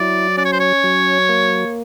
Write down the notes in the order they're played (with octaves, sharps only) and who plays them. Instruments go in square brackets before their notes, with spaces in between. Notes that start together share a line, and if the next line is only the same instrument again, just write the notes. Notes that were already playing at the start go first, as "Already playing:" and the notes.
Already playing: [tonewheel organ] F#3 E4 [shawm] D5
[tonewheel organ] C#4 [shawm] D5
[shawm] C#5
C5
C#5
[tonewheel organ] F#3
A#3